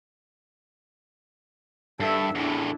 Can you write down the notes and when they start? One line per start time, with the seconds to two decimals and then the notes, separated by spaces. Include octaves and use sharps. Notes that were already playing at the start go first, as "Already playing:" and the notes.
2.00 G2 A4 E5
2.35 E2 A2 D4 E4